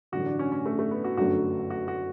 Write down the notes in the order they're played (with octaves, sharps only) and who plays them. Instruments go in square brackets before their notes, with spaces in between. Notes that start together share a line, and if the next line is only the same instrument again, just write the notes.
[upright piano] A1 G2 D3 F#3 [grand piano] F#4
[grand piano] D4
C#4
C#4
A3
A3
B3
F#4
[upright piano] G1 F#2 D3 F#3 A3 [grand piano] F#4
[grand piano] F#4
F#4